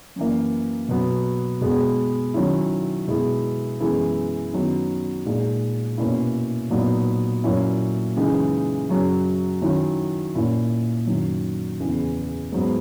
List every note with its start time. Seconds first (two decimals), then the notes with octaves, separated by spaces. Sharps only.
0.16 F#2 E3 A#3
0.89 B2 F#3 B3
1.61 B2 G#3 B3
2.34 D#3 F#3 C#4 E4
3.08 B2 G#3 B3 E4
3.80 F#2 E3 G#3 B3 E4
4.53 F#2 D#3 F#3 B3 D#4
5.26 A#2 G#3 D#4
5.98 B2 A#3 C#4 E4
6.70 A#2 F#3 B3 D#4
7.44 A#2 F#3 A#3 C#4 E4
8.16 F#2 C#3 E3 G#3 D#4
8.89 F#2 C#3 F#3
9.61 D#3 F#3 C#4 E4
10.35 A#2 A#3 C#4 E4
11.07 F#2 D#3 F#3
11.80 E2 C#3 E3
12.52 G#2 F#3 B3